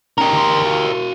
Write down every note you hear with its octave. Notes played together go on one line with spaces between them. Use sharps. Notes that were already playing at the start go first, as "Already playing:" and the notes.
C#4 D#4 G4 A#4
D2 C6
F#4 F5